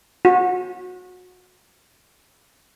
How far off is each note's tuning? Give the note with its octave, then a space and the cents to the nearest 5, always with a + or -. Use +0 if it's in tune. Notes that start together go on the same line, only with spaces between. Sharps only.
F#4 -25